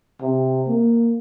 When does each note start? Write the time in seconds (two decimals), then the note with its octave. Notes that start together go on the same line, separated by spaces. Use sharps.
0.22 C3
0.68 A#3